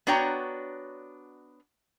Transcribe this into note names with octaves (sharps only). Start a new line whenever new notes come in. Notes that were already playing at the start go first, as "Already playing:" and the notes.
B3 D4 F#4 C#5 G5 A#5